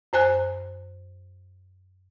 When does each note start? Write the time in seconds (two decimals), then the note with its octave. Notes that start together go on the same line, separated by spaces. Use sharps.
0.13 F#2 C5 G#5 F#6